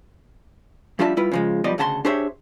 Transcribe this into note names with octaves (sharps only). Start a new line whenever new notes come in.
F2 G3 D4 F4 E5 A5
G3 E4 F4 B4
C#3 F3 G#3
B1 F3 G3 B3 D5 D#5
D2 C#3 F#5 A5 B5 C6
D4 G4 G#4 C5 C#5 E5